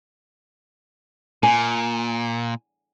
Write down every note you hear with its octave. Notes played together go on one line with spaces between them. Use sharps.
A#2 G#5